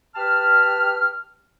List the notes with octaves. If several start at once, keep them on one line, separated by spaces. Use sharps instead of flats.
G4 B4 A5 F6